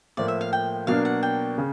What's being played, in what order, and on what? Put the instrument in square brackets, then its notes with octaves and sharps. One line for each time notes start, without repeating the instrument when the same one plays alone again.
[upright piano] A2 F3 A#3 [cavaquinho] D5
[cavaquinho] E5
F5
G5
[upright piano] B2 F#3 A#3 D4 [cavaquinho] F5
[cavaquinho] F#5
G5
[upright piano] C#3